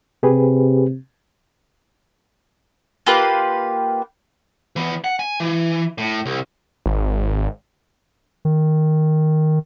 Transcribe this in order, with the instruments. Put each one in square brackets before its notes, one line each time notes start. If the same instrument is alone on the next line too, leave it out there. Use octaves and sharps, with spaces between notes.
[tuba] C3 [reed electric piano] G4 G#4 B4
[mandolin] A#3 F4 G4 B4
[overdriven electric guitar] E3 B3
F#5
G#5
E3
A2
C2
[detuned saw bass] G#1
[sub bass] D#3